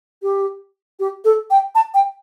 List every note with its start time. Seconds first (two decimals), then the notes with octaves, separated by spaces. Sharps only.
0.23 G4
0.99 G4
1.24 A4
1.50 G5
1.75 A5
1.94 G5